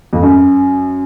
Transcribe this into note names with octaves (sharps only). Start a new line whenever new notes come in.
F2
F#2